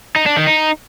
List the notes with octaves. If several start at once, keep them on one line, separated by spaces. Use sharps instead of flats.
D#4
D4
D#3
D#4